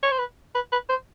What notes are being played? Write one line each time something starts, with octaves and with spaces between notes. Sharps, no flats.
C#5
C5
B4
B4
B4
C5